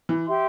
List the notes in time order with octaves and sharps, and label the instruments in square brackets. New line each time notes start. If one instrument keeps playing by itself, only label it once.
[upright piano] E3
[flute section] G4 E5 C6